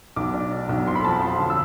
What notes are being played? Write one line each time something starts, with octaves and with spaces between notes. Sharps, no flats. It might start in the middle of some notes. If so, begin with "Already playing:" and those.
B1 D6
D4
D4
B1
F2 C6
B5
F3 A5
B5
F2 C6
D3
E6